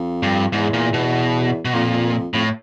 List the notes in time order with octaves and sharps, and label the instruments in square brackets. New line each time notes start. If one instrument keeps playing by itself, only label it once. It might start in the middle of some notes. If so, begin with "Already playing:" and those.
Already playing: [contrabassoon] F2
[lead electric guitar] G2
[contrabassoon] E2 [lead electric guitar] G#2
[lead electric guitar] A#2
B2
B2
[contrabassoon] F2 [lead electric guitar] A#2
[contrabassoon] F2 [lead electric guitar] A2